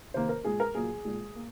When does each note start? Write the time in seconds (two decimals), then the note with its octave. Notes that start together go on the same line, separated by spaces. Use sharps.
0.14 C3 D#3 A#3 C5
0.29 A#4
0.44 A#2 G#3 G#4
0.60 A#4
0.75 A#2 F#3 A#3 G#4
1.05 A#2 G#3
1.35 A#3